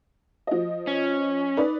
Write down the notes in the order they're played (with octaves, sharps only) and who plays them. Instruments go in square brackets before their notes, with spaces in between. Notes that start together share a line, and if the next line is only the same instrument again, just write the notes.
[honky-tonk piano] F3 D#5
[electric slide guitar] C#4
[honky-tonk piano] D#4 B4 D5